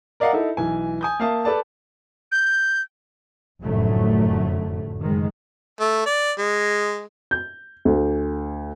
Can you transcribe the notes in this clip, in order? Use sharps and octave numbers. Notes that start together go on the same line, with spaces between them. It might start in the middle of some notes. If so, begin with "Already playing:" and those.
A#4 D5 D#5 F5 F#5 A#5
D#4 E4 A4
B1 E3 G#5
G#5 D#6 G6
A#3 E5 F5 A5 D#6
A4 B4 D5 A5
G6
F1 F#2 A2 D3 F#3 A3
F#1 D#3 G#3
A3
D5
G#3
G6
D2